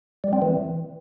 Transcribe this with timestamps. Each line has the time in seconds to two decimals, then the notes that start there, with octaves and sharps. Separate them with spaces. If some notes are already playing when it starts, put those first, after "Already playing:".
0.24 G3
0.33 C4
0.42 E3